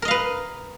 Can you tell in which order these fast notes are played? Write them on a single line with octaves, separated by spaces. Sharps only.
A#4 D#5 F5 B4